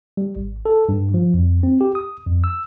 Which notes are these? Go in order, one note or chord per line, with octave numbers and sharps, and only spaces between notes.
G3
G#1
A4
G2
F3
F2
C4
G4
D#6
F2
E6